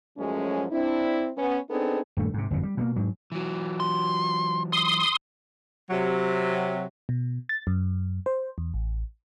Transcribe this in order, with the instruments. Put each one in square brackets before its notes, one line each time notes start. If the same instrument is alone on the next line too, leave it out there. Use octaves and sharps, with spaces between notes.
[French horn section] F#2 F3 F#3 G#3 A3 C#4
C4 D4 E4
B3 C#4
B3 C4 D4 D#4 G#4 A4
[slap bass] D#1 G2 A3
G#2 C3
G1 F2 B2
G3
B2 G3 A#3
G#2 F#3
[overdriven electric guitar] E3 F#3
[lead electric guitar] C6
[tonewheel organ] C6 D#6
[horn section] C3 F#3
[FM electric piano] B2
A6
F#2
C5
E2
A1